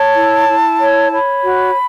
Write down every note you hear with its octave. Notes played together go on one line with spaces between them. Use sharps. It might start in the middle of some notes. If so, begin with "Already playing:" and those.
Already playing: C#5 A5
E4
E4
C#5
C#5 B5
F#4